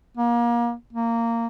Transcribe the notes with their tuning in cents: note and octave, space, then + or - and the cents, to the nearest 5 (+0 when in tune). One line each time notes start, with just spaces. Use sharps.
A#3 +30
A#3 -15